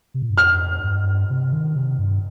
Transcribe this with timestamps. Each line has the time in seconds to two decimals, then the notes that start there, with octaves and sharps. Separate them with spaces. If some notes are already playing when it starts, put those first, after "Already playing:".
0.14 C3
0.22 A#2
0.30 G2
0.37 F2 F6
0.84 G2
1.30 C3
1.53 D#3
1.76 C3
1.98 G2